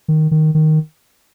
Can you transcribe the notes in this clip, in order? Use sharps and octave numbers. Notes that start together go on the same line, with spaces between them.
D#3
D#3
D#3